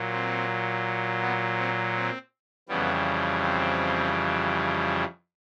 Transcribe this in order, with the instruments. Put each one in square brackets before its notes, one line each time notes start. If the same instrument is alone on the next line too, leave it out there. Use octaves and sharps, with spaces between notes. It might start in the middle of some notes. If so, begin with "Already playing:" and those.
Already playing: [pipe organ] A#2 F#3
C4
B3
C4
C4
F2 C#3 E3 G3 B3
C4